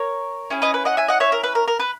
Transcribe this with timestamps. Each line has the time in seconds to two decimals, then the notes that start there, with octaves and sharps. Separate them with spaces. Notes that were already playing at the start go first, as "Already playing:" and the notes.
Already playing: A#4 C#5
0.50 C#4 E4 G#4
0.62 B4 D#5
0.74 B4
0.85 D#5 F#5
0.97 E5 G#5
1.08 D#5 F#5
1.20 C#5 E5
1.32 A#4
1.43 B4
1.55 A#4
1.68 A#4
1.79 B4